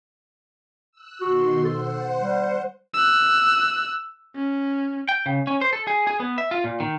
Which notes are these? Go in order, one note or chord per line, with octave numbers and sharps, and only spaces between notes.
E6 F#6
B2 D#3 F#4 C6
A4 C5 F#5
G3
E6 F#6
C#4
G5
C#3
C#4
C5
A4
G#4
G#4
B3
E5
F4
A#2
D#3